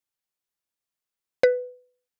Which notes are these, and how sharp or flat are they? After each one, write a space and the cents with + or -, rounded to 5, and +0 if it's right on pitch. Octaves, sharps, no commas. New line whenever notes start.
B4 +10